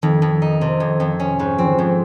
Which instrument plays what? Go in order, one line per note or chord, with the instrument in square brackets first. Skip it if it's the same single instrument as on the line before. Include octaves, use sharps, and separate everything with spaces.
[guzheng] F2 [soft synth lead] D#3
[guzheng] F2
D#4
C3
F2
F2
C#4
G#2
[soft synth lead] F3 [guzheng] C4
[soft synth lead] D#3
[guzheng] F2 [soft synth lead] F3